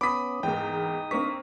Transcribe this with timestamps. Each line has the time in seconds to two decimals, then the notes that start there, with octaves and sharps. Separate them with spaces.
0.01 B3 C#4 B5 D6 D#6 B6
0.43 E2 G#2 A#3 D#4 G5 D#6
1.11 A#3 C4 D4 C#6 B6